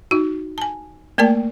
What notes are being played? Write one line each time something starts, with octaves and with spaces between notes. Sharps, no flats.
D#4 F#4
G#5 A5
A3 A#3 A#4 D5 G5 A5